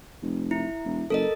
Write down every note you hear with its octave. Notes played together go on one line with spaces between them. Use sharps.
F1
E4
E1
F#1 A4 A#4 D#5